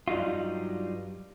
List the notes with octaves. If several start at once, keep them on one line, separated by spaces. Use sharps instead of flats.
G2 F#3 G3 D#4 F4